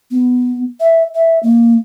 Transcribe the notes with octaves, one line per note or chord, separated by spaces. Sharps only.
B3
E5
E5
A#3